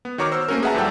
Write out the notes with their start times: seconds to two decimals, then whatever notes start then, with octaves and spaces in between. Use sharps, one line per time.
0.05 B3
0.18 D#3 F#4 C#5 A#5 D6 F6
0.32 C5 E6
0.48 A3 A#3 C#4 F#4 A#4
0.63 G#4 B4 E5 F#5 A5 A#5
0.74 E2 G#2 F#3 G3 A4 G5